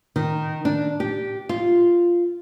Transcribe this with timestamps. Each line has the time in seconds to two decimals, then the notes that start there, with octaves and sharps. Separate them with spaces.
0.16 D#3
0.65 D4
1.00 G4
1.49 F4